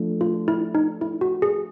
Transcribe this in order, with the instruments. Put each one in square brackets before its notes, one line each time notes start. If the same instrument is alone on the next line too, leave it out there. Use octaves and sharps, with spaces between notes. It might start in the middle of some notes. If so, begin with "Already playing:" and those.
Already playing: [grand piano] F3 A3 D4
[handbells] F4
E4
D#4
E4
F#4
G#4